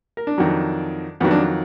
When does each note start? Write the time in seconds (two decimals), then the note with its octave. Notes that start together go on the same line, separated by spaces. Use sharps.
0.17 A#4
0.27 D4
0.38 F2 D#3 F#3
1.20 F2 D#3 F#3 B3
1.31 D4